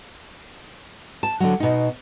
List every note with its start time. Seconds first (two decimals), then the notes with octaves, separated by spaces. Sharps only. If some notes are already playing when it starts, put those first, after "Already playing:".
1.23 A5
1.40 D3 F#3
1.60 B2 D#4